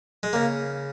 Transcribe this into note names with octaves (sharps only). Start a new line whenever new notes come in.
G#3
C#3 A#3